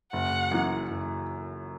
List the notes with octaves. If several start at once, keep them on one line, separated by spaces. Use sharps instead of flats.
F#1 F#5
F#2 E3
F#1